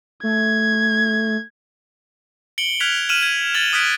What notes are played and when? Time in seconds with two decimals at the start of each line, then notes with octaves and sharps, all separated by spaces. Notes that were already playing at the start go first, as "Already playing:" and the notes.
0.23 A3 G#6
2.58 C#7 D7 F#7 G7
2.80 F6 F#6 G#6 B6 F7
3.09 F6 D#7 E7 F#7
3.23 G#6
3.54 F6 G#6 A6 F#7 G7
3.73 D#6 F6 F#6 G#6 B6 D7